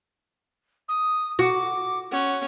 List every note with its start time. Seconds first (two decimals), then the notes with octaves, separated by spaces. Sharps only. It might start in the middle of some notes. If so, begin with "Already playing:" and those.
0.88 D#6
1.39 F#4 D6
2.11 C#4 F#5